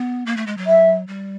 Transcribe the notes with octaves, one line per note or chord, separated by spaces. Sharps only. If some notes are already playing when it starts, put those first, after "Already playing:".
Already playing: B3
A#3
A3
G#3
F#3
E5
G3